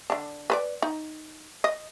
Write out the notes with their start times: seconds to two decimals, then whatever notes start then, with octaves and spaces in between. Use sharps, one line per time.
0.10 D3 D4
0.50 B4 C5 D5
0.82 D#4
1.64 D#5